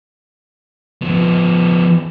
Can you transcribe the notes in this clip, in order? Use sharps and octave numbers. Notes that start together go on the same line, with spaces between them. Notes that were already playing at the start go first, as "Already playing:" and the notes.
F3 B3